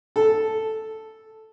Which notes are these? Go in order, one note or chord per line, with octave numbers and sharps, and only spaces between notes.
A4